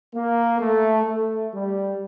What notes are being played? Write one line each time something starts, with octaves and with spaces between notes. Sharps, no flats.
A#3
A3
A3
G3